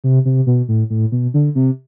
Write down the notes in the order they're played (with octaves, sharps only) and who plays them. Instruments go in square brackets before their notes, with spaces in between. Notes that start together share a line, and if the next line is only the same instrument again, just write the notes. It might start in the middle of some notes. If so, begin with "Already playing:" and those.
[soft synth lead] C3
C3
B2
A2
A2
B2
D3
C3